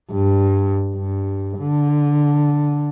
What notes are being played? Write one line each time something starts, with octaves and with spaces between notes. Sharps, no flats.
G2
G2
D3